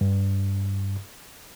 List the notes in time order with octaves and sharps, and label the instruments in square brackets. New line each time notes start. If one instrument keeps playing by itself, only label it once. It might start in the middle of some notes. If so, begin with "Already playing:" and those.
[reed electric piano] G2